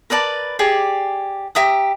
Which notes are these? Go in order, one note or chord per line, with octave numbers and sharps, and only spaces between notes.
A#4 B4 D5 A5
G4 G#4 D5
G4 E5 A#5 D#6